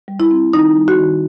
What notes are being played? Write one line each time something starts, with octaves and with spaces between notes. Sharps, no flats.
G3
E4
C4
D#3 D#4
G3
F#4
D#3